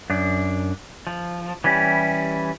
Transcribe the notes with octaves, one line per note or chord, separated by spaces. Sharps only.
F#2 D4
F3
E3 G3 C#4 E4 G4